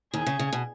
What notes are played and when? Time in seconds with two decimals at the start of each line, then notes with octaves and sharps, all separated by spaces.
0.13 D#2 D#3 G#4
0.26 C#3
0.39 C#3
0.53 B2